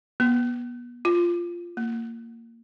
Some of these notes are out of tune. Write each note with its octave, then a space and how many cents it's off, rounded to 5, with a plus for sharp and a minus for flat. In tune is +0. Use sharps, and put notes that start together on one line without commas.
B3 -30
F4 -10
A#3 -20